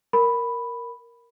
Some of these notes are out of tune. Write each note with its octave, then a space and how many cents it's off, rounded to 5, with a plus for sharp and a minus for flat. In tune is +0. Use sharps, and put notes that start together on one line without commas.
A#4 +0 B5 +0